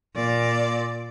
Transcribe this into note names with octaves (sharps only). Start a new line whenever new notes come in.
A#2 D5